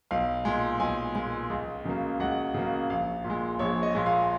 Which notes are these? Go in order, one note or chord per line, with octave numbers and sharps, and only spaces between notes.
B1 F5
A#2 G#3
B1 G#5
A#2 G#3
C#2
C#3 F#3 A#3
C#2 F#5
C#3 F#3 A#3
A#1 F5
A#2
G#3
A#1 C#5
D#5
A#2 G#3
F5